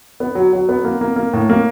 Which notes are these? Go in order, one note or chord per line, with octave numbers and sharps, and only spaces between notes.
B3
F#3
F#3
B3
A#3
A#3
A#3
A2
A#3